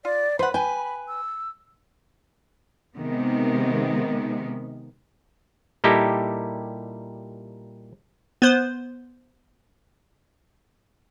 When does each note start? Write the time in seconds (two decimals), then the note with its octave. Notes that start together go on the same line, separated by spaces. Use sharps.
0.05 F4 D5
0.39 B4 C5 F#5 B5
0.54 B4 G5 G#5
1.08 E6
2.95 C3 D#3 G#3 B3
5.84 A#2 G3 D#4 E4 G4 A4
8.42 B3 C5